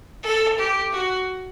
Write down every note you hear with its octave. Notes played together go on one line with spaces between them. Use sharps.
A4
G4
F#4